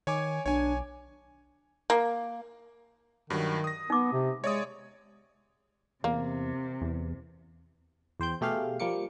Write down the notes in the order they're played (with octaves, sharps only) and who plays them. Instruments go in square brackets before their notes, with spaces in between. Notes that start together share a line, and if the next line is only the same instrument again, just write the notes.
[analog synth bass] D#3 [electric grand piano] C#5 G#5 D6
[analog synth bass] B1 [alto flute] D4 [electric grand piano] C#5 G#5
[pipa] A#3
[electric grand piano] G2 F#3 [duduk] D#3
[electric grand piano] D#6 A#6
[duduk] B3 [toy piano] D#4 D6
[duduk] C3
[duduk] G#3 [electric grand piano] C#5 D5 D#6 [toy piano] E5
[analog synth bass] E2 [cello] C3 [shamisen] A#3
[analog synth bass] E2
[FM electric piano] E2 C5 G5 G6
B2 A3 G4 G#4 F5
F3 G3 A#3 D6 C#7